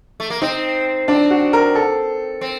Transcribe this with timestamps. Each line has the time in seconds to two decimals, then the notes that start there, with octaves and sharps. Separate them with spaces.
0.20 A3
0.30 A#3
0.42 C4 D#4
1.08 C4 D4
1.30 F#4
1.53 A#4
1.75 A4
2.41 C4